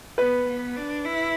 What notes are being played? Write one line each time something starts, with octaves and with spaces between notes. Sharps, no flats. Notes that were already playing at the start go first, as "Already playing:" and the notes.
B3 B4
B3
D4
E4